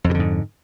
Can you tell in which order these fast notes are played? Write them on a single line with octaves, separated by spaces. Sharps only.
F2 B2 D3 G#2